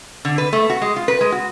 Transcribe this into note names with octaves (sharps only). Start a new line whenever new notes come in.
D3
B4
A3
F#4
G#3
F4
B4
G#3
F#4